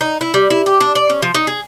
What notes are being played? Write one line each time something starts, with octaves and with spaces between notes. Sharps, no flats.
D#4
E4
G3
E4
G4
D4
D5
C#4
F3
D#4
G#4